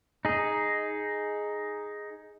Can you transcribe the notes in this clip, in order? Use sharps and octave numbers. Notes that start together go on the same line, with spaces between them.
D#4 G#4